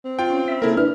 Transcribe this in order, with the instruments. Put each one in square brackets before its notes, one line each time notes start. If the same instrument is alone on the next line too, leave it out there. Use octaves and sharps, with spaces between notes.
[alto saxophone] C4
[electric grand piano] F4 G5
[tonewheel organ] C#4
E5 B5
[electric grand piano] C#3 E4 A#4 [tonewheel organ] A#3 A4
[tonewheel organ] D4 E4 B4 [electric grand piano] F6